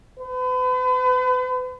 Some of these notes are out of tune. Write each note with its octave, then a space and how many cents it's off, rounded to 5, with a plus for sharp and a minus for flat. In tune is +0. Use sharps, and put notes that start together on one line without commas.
B4 +40